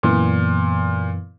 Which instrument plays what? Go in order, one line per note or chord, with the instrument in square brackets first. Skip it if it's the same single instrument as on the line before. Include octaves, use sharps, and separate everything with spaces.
[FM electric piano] F#2 E3 B3 [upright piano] A#2